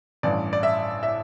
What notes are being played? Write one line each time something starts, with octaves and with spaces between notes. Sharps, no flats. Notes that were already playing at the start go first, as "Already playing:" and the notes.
A1 G2 E3 D5
D5
E5
E5